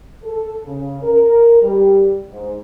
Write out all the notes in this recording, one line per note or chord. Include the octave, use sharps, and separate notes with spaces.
A4
C#3
A#4
G3
G#2